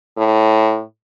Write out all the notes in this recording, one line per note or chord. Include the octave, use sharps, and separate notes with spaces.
A2